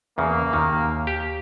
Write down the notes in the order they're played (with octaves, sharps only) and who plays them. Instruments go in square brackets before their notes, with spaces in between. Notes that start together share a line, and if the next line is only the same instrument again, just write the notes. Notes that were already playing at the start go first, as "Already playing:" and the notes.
[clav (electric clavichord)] E2 C#3 [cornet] A#3
[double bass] D#2 [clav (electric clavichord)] D#3
[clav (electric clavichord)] G4